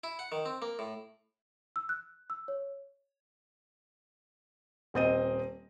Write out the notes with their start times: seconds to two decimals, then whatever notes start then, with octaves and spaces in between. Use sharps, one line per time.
0.04 E4
0.19 F#5
0.32 D#3
0.45 C4
0.62 A#3
0.79 A2
1.76 E6
1.89 F#6
2.30 E6
2.48 C#5
4.94 D#1 C4 D#5 D#7